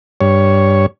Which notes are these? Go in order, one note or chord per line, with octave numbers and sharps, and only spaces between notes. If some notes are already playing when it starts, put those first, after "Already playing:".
G2 C#5